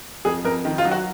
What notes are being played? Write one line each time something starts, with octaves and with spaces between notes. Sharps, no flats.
F2 G#4
F2 A#4
D#3
F4
F#3
F#4